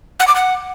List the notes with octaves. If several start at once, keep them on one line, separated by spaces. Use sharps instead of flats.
F#5
D6
F#5